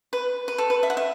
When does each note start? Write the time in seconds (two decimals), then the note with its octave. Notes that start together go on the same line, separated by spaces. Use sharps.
0.13 B4
0.48 B4
0.58 A4
0.70 B4
0.83 E5
0.90 F#5
0.97 E5